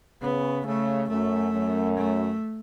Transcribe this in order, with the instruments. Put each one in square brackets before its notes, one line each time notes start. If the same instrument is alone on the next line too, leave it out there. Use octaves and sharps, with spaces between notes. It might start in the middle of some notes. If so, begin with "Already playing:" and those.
[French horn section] C#3 [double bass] B3
[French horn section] C#3 [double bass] A3
[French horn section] F#2 [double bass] A3
[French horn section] F#2
[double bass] A3